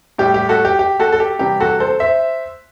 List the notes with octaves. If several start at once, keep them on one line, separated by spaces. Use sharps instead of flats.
A2 G3 G4
G4
F#4 A4
G4
G4
F#4 A4
A4
G4
C3 E3 G3 G4
F#4 A4
A4 C5
C5 E5